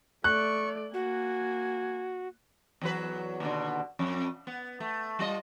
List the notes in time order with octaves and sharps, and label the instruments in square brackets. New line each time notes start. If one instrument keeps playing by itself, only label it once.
[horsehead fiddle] A3 D5 [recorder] C#6 [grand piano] F#6
[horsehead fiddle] A#3 G#5 [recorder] F#4
[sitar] E2 F#3 B4
D#2 B2 D3
F2
B3
A3
G3 F4 D#5